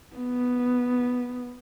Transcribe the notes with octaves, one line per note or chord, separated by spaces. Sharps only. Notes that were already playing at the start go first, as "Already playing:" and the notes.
B3